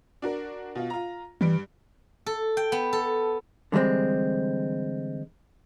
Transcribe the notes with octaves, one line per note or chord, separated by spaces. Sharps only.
D4 F#4 A#4
B2 F4
F4 A#5
G2 E3 G3 D7
A4
G5
B3
A4
D3 E3 G3 G#3 C4